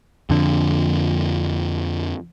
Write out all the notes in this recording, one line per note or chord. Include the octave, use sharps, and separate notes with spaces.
F2 D3